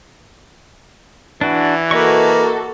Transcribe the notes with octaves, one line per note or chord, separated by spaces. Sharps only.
E3 D4 F#4
A#3 F#4 A4 B4 D#5 C#6